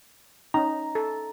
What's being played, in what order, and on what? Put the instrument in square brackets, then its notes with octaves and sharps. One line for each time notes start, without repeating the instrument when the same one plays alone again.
[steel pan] C#4 D#4 [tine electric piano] A#5
[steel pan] A4